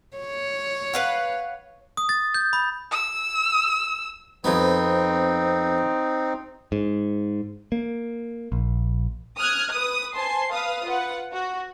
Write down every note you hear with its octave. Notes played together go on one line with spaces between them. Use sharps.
C#5
B4 F5 F#5
D#6
A6
G6
B5
E6
F2 B3 C4 D#4
G#2
A#3
A#1
D#6 F6 F#6 G#6
B4 D#6
C5 G#5 A5 C6 C7
B4 F5 D#6
F4 B4 F#5
F#4